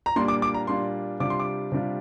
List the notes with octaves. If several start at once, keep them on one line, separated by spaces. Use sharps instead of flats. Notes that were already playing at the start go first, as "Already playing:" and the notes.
A#5
A#2 G3 A#3 D4 F4 C6
D6
D6
A#5
A#2 G3 A#3 D4 F4 C6
C3 G3 D4 F4 D6
C6
D6
C3 G3 D4 F4